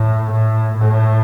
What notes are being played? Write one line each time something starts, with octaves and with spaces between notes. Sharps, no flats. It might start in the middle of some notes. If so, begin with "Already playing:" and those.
Already playing: A2
A2
A2